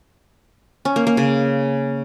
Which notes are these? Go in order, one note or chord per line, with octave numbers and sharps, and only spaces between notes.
C#4
A#3
A#3
C#3